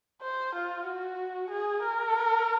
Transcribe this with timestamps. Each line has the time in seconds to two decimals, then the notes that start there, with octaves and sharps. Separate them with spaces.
0.22 C5
0.55 F4
0.87 F#4
1.50 G#4
1.83 A#4